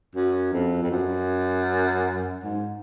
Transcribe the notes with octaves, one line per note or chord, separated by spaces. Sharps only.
F#2
F2
F2
F#2
G#2